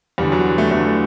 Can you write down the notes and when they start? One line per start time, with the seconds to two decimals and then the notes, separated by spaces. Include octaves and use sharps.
0.18 E2 D3 G3
0.32 F#3
0.58 A3
0.71 E2 D3 A3